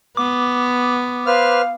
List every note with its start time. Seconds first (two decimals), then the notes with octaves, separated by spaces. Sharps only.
0.17 B3 D6
1.27 B4 C5 F5 F6